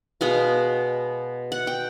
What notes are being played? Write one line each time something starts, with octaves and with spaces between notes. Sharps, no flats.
B2 G#3 B3 F5
F#5
G5